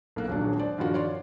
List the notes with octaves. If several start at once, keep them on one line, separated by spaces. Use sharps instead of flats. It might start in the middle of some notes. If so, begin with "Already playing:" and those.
B1 A#3 F#6
D#1 F#3 G#3 D4
C5 D5
G2 D#3 F3 F4 F#4
C#5 D5 C6